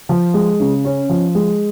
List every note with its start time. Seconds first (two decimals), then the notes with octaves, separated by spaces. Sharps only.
0.09 F3
0.34 G#3
0.60 C#3
0.85 C#4
1.09 F3
1.35 G#3